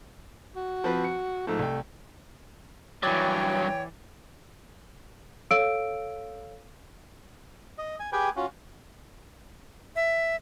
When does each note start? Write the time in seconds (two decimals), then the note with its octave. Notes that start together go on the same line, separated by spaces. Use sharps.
0.56 F#4
0.84 F3 C4 B4
1.04 C#7
1.47 G#2 F3 A3
1.59 C2 G5
3.03 G2 E3 F#3 C#5 D5 G5
5.51 A4 C#5 F5 E6 D7
7.78 D#5
8.00 G#5
8.13 G4 G#4 B4 G5 G#5
8.36 C#4 F4 F#4
9.96 E5